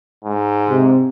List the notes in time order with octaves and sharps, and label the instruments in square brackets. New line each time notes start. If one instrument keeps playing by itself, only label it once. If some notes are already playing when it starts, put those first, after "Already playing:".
[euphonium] G#2
[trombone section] C3